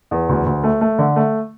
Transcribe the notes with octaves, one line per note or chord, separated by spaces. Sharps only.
E2
D2
D2
A3
A3
D3
A3